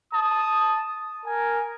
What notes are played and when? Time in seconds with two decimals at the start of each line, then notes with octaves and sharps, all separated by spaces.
0.13 A5 D#6
1.26 A#4 G#5